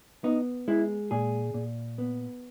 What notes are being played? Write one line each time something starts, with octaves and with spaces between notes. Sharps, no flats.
B3 D#4
G#3 E4
A#2 G#4
A#2
B3